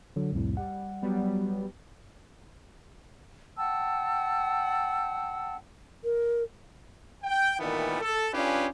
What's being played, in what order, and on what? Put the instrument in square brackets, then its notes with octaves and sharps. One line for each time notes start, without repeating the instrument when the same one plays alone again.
[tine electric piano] D3 F#3
C2 F2 A2
[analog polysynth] G3 [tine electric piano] F#5
[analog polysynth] F#3 G3 B3
[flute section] F#5 G5 A5 E6
[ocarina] A#4
[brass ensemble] G5
A#2 D#3 E3 G3 A3 B3
A4
C#4 D4 F4 G4 G#4 B4